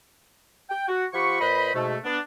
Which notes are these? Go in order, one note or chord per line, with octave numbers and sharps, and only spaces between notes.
G5
F#4
F3 F4 G4 F#5 B5 C#6
A#2 B4 C5 D#5 B5
G#2 B2 A3
B3 D4